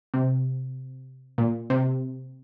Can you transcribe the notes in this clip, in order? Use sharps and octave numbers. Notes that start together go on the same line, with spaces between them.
C3
A#2
C3